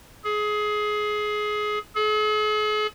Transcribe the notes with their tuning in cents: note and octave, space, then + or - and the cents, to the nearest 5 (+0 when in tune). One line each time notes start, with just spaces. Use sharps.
G#4 +20
G#4 +45